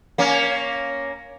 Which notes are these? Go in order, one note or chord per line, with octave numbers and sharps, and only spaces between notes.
A#3 C#4